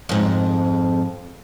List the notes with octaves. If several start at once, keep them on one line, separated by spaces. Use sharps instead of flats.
F2 G#2